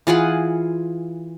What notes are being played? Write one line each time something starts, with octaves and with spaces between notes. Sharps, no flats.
E3 F4 G#4 F#5